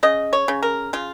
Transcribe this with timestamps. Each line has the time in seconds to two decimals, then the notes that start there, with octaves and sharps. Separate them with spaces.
0.03 C#3 D#5
0.33 C#5
0.48 C#3
0.63 A#4
0.93 C#3 F4